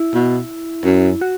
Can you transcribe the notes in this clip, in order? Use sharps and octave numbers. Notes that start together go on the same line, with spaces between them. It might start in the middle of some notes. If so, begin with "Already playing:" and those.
Already playing: E4
B2
F#2
F#4